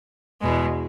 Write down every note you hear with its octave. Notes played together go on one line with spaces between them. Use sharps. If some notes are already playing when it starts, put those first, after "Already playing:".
E2 B2 G#3